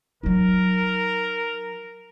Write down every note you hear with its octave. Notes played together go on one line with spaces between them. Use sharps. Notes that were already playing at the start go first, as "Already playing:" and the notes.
F#3 D#4 A#4